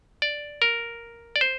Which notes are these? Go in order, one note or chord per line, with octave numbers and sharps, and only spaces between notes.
D5
A#4
D5
C5